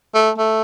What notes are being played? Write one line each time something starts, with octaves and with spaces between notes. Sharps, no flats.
A3
A3